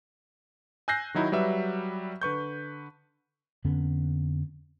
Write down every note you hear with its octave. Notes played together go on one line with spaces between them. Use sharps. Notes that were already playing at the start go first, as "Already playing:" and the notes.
G#5 E6 F#6 G6 A#6 C7
D#3 F#3 D#4 E4
F#3 G3 B4 E5
D3 B4 C#6 G6
F2 D3 B3 C#4